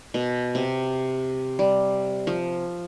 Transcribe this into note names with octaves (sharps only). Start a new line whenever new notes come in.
B2
C3
G3
F3